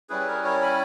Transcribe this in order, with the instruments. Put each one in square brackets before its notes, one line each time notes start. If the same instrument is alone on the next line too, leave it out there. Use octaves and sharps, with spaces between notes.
[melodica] G3 C#4 E4 G#4 B4
A#4 C#5
A#4 C#5
G#5 B5